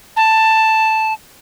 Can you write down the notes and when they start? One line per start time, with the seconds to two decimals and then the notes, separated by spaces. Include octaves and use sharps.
0.17 A5